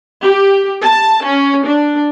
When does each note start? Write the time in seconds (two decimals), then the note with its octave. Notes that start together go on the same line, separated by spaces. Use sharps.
0.22 G4
0.83 A5
1.26 C#4
1.66 D4